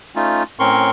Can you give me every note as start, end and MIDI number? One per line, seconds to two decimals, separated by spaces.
0.16 0.43 57
0.16 0.43 61
0.16 0.43 63
0.16 0.43 65
0.59 0.91 45
0.59 0.91 60
0.59 0.91 61
0.59 0.91 70
0.59 0.91 84
0.59 0.91 85